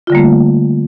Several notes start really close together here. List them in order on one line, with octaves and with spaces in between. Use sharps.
F4 D3 G3 A#3 A3